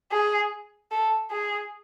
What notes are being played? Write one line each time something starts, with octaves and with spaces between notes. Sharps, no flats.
G#4
A4
G#4